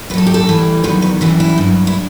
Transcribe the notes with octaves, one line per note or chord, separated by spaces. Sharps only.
A2 F#3 A4 B4
G4
A4
A2 E3 G3
E2 D#3 F#3 B4
B4
F#2 E3 G3 B4
E4
G2 F#3
E4